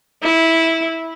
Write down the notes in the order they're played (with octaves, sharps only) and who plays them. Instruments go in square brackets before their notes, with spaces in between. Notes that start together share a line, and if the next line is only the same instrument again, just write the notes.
[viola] E4